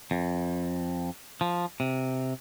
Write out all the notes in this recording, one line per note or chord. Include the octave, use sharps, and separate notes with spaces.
F2
F3
C3